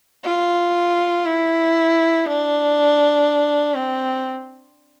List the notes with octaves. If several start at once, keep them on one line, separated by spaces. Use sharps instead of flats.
F4
E4
D4
C4